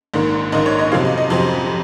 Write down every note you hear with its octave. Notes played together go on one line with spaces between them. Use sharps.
A#1 G#2 D#3 A#3
A#1 G#2 D#3 A#3 D#5
C#5
D#5
F2 C3 F#3 C4 F5
D#5
D#5
F2 C3 F#3 C4 C6